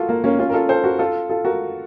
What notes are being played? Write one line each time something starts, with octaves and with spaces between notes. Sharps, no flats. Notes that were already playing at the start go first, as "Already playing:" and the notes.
Already playing: F4 F#4 A4 A#4
A#3
A#3 C#4
C#4 F4
A#4
F4 A4
A4 C5
F#4 A#4
F4 A4
F4 A4
F#4 A#4